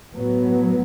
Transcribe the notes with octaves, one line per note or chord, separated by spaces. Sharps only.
A2 F#3 B3